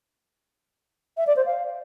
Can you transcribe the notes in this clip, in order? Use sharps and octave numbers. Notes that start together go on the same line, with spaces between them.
E5
D5
C5
F5